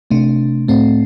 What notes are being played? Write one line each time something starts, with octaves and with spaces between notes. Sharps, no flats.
C3 A3 D4
A2 A3 C4